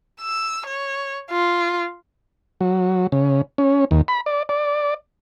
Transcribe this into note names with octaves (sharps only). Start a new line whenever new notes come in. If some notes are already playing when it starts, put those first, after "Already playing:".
E6
C#5
F4
F#3
C#3
C#4
D#2
B5
D5
D5